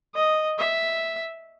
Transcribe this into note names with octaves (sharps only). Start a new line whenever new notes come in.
D#5
E5